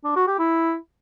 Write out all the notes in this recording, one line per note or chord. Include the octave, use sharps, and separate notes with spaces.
D4
F#4
G4
E4